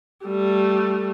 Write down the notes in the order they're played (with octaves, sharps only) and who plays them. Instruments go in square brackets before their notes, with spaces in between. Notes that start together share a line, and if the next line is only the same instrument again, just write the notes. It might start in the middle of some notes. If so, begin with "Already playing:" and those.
[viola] G3 A3